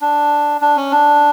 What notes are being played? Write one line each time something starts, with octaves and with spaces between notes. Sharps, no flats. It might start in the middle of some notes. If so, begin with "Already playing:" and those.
D4
D4
C#4
D4